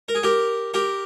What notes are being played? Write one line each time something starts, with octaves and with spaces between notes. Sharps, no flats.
A#4
G#4
G4 A#4
G4 A#4